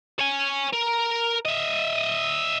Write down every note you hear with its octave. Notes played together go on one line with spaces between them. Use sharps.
C#5 G#5
A#4
D#5 E5